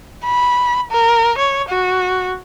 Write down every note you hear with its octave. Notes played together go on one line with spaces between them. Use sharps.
B5
A#4
C#5
F#4